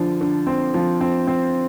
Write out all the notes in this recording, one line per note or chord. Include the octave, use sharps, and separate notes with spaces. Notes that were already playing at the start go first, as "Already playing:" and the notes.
Already playing: D3 F3
D3
C4
F3
C4
C4